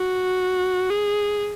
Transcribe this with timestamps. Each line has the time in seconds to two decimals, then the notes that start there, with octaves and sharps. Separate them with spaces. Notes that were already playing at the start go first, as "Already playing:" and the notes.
Already playing: F#4
0.90 G#4